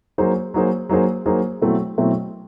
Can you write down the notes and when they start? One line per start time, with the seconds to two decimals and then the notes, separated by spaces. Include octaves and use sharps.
0.18 F#3 A#3 D#4 G#4 C5
0.54 F#3 A#3 D#4 G#4 C5
0.89 F#3 A#3 D#4 G#4 C5
1.26 F#3 A#3 D#4 G#4 C5
1.62 B2 F#3 A3 C4 E4
1.98 B2 F#3 A3 C4 E4